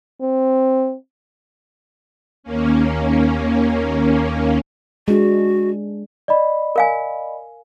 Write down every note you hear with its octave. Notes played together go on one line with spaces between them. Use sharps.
C4
D#2 A#3 C#4
G#3 D4 F#4
D5 D#5 B5
A#4 F5 G#5